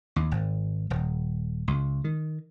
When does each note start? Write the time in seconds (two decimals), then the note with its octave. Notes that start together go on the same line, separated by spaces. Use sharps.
0.16 D#2
0.31 G#1
0.90 D#1
1.68 C#2
2.04 D#3